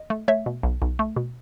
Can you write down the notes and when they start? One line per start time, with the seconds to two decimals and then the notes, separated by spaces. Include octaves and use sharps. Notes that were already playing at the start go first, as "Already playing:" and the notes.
Already playing: D#5
0.10 A3
0.28 A3 C#5 E5
0.46 B2
0.63 B1
0.82 B1
0.99 A3
1.16 B2